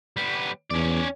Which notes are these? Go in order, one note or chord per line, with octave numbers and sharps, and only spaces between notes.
G3 B3
E2 C#4 D5